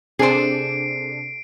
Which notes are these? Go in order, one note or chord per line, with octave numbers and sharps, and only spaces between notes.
C3 D4 G#4 A4 C5 C7 D7